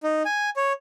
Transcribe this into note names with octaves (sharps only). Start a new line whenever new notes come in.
D#4
G#5
C#5